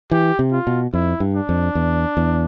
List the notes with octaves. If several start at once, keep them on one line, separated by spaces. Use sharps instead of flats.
E3 G4
C3
F4
B2
F2 E4
G2
D4
F2
E2
E2